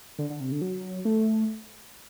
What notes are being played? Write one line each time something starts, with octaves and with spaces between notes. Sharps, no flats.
D3
D3
C3
D3
F#3
A3